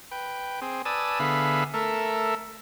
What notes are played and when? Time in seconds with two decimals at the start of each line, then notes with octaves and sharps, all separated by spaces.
0.11 B4 G5
0.62 C4 G#4
0.85 B4 D5 G#5 A5 D#6 E6
1.20 D3 B3 G#4 E5 F5 B5
1.74 A3 A4 A#4 E5